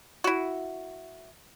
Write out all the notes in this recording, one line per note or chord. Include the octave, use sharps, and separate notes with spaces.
E4 F#4